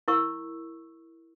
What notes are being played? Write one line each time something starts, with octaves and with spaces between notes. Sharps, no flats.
E4 A#4 C#6 E6